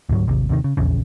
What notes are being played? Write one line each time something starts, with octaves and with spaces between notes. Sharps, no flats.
D2 G#2 F3 F#3
A1 D#2 C3
D#2 C3 D#3
C#3
D#1 A#1 E2 C#3